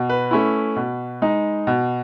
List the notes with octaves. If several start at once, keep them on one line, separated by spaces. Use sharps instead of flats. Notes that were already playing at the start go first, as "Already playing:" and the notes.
Already playing: B2
B4
A3 C#4 E4
B2
G#3 D#4
B2